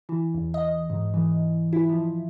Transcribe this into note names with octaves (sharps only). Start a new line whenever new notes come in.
E3
E2
D#5
G#2
E3
E4
F3